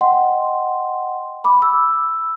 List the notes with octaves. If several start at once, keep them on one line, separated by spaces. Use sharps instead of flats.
D#5 F#5 G5 C6
B5 D6
E6